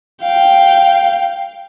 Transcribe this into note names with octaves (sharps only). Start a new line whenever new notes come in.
F5 G5